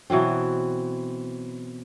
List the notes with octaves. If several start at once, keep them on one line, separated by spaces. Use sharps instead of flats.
B2 E3 F#3 C4